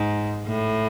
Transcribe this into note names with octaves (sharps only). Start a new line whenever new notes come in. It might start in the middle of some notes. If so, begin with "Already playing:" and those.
Already playing: G#2
A2